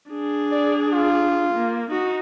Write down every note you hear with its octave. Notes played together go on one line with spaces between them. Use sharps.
D4 G#4
D5
F4
A#3
D#4 F#4